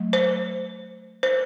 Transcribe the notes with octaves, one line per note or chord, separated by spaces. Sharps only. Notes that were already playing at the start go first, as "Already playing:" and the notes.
Already playing: F#3 A3
C5
C5